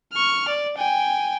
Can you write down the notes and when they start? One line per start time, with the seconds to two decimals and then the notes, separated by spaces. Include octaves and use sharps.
0.13 C#6 F6
0.48 D5
0.78 G5 G#5